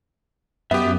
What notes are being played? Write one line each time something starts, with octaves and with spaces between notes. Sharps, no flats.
F#2 B3 G4 E5 D#6